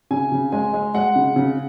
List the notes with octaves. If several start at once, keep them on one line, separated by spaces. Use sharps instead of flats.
C#3 G#5
C#3
G#3 G#5
G#3
G#3 F#5
C#3
C#3